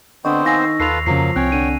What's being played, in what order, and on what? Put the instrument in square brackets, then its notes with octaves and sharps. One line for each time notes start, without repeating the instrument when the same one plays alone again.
[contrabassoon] D3 [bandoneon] B3 C4 C5 [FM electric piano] D#5 [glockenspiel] C#6
[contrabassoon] D#3 [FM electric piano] F5 G#5 C7 [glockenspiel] E6 A#6
[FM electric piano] D#2 [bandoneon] F4 A4 B4 [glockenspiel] C7 F7
[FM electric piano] F2 C#3 [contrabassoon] F3 [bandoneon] F#3 A#3 [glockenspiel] C7
[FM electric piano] C2 C4 [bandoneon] C#5 G5 [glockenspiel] G#5 F#6
[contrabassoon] D3 [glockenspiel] D#7